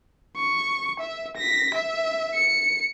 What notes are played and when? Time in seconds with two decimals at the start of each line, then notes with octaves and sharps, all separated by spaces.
0.37 C#6
1.00 E5
1.37 A#6 B6
1.74 E5
2.34 C#7